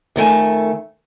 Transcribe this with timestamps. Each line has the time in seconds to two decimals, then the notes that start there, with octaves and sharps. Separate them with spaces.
0.16 F2 D#3 A3 G#5